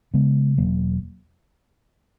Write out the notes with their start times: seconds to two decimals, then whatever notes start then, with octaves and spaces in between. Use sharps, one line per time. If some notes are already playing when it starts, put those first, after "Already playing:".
0.14 C#3 G#3 B3
0.57 E1 F#3 A#3